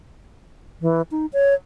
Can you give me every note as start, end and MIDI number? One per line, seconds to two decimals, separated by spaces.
0.82 1.02 52
1.11 1.26 63
1.33 1.54 73